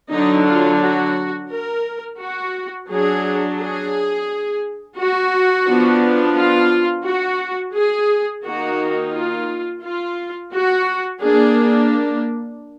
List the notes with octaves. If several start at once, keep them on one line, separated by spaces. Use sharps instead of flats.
D3 F#3 D4 D#4
F4
F#4
A#4
F#4
F#3 D4 G#4
G#4
F#4
F3 B3 D4
F4
F#4
G#4
D#3 A#3 D#4 F#4
F4
F4
F#4
A#3 D4 G#4